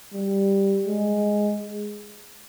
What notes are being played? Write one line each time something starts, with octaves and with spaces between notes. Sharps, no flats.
G3
G#3